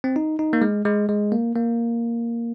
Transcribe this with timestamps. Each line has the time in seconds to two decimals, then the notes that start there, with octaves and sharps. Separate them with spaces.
0.04 C4
0.16 D#4
0.39 D#4
0.53 A#3
0.62 G#3
0.85 G#3
1.09 G#3
1.32 A#3
1.55 A#3